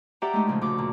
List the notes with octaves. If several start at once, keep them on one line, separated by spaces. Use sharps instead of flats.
G4 D5 E5 F#5 A#5
G#3 A3 D#4
A#2 C#3 F3
D2 C#3 D6
A#2